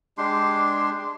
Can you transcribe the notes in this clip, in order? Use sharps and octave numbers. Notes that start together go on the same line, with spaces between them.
G#3 D4 G4 C6